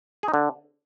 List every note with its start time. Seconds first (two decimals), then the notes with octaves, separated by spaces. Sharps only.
0.23 G#4
0.28 D#4
0.34 D3